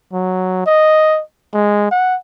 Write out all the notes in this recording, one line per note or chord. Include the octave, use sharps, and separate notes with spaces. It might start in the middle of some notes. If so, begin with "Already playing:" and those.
F#3
D#5
G#3
F#5